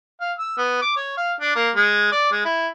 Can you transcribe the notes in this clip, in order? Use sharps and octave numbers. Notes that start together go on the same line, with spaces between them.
F5
E6
B3
D6
C#5
F5
D4
A#3
G#3
D5
G#3
E4